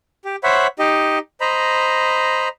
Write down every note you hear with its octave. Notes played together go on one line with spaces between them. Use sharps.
G4
C5 C#5 E5 F#5 B5
D#4 G4 D#5
C5 D#5 A#5 B5